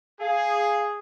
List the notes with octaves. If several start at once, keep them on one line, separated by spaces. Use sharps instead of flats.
G#4 F5